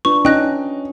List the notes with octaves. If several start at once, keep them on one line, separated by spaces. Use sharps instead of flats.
D4 F4 B4 C#6
C#4 D#4 G5 F#6 A#6